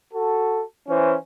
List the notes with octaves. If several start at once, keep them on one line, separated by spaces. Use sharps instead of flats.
F#4 A4
E3 C#4 C5